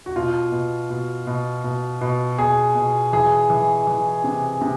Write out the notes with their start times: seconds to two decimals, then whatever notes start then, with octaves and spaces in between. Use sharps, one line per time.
0.06 F#4
0.16 B2 F4
0.52 B2
0.90 B2
1.27 B2
1.64 B2
2.01 B2
2.39 B2 G#4
2.75 B2
3.13 E3 G#4
3.50 E3
3.87 E3
4.24 C3
4.61 C3